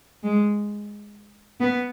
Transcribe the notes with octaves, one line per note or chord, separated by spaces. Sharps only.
G#3
B3